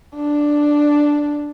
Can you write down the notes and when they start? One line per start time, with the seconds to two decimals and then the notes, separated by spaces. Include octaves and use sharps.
0.15 D4